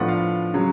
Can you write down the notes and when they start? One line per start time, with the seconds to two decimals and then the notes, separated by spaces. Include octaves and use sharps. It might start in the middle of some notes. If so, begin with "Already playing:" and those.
Already playing: A2 F3 B3 D4 F4 F#5
0.08 F5
0.54 C#3 F#3